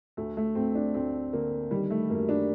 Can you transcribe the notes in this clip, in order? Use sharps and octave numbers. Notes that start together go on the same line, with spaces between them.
D2 A3
A3
D2 C4
D4
D2 C4
D3 A#3
D#3 G3
A3
F#2 A#3
D4